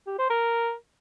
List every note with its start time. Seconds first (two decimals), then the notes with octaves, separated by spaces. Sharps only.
0.07 G4
0.18 C5
0.30 A#4